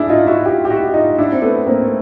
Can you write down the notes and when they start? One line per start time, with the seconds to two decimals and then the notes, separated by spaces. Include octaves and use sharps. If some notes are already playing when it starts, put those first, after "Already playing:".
Already playing: D4 E4 G#4
0.10 D#4 F4
0.27 E4 F#4
0.46 F4 G4
0.65 G4
0.70 E4 F#4
0.94 D#4 F4
1.18 D4 E4
1.32 C4
1.42 A3 B3
1.67 A#3 C4
1.84 A3